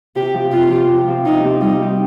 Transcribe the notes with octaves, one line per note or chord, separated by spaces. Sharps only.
C3 G4
F3 C4 G4
C3 F4
F3 C4 G4
C3
F3 C4 G4
C3 D#4
F3 C4 G4
G3 D#4
C4 D#4 G4